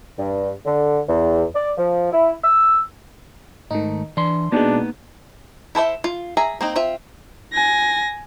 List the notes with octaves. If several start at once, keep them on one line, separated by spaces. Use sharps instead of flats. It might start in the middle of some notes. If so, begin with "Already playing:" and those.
G2
D3
E2
D5
F3
E4
E6
G#2 D#3 A3 D#4
E3 D4 C6
B2 G#3 A#3 B3 D4 D#4
E4 A4 C5 E5
F4
G#4 E5 A#5
A#3 C4 D#4
C4 F4 E5
G#5 A#6